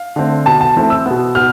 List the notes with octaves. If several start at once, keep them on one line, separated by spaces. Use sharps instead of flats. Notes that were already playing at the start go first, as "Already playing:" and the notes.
Already playing: F5
D3 A3 C4
B2 B3 A5
A5
E3 A3 C4
E6
B2 B3
B2 B3 F6